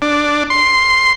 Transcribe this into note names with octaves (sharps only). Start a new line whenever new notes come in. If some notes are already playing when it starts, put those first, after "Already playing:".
D4
C6